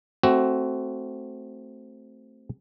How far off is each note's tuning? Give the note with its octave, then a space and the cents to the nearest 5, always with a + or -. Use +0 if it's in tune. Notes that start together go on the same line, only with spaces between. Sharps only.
A3 +0 C4 +0 F#4 +15